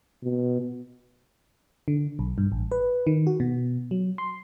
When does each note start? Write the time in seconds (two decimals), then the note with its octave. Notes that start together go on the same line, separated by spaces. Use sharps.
0.23 B2
1.88 D3
2.19 B1
2.38 G2
2.52 A1
2.72 B4
3.07 D#3
3.27 F#4
3.40 B2
3.91 F#3
4.18 C6